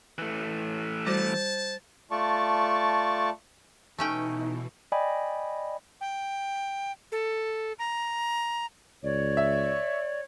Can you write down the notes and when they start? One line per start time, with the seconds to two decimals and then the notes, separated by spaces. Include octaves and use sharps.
0.18 E3 A3
1.07 G3 F#4 C5 A5
2.11 A3 F4 D5 A5 C#6
3.98 B2 E3 A3 C#4 D#4 G5
4.92 D5 D#5 G5 G#5 B5
6.01 G5
7.12 A4
7.79 A#5
9.04 C#2 C#5 D5
9.37 E5